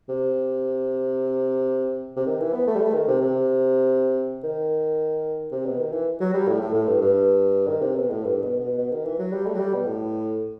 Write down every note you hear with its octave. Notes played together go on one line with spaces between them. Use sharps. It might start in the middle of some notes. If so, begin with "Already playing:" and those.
C3
C3
D#3
E3
B3
A3
G3
A3
D#3
C3
C3
D#3
C3
B2
D#3
E3
F#3
G3
A2
A2
A2
G2
G2
D#3
C3
B2
A2
G2
B2
B2
B2
D#3
E3
F#3
G3
A3
F#3
G3
B2
A2